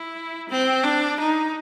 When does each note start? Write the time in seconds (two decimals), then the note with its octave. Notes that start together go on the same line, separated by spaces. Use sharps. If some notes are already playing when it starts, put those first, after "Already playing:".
Already playing: E4
0.49 C4
0.84 D4
1.20 D#4